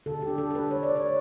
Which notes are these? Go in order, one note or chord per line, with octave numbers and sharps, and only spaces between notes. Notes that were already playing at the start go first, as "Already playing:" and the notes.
D3 A4
G4
D4
A4
D4 A4
B4
D3 C#5
D5
D3 C#5